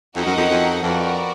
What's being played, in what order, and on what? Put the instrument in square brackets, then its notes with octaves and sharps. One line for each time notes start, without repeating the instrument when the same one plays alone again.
[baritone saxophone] F2 [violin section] D#4 F#4 A#4 D#5 F#5
[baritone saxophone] F#2
F2
F2
[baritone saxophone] F2 [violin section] B3 D4 F#4 A#4 D5